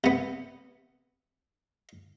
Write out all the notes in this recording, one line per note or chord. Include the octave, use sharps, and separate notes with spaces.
C3 B3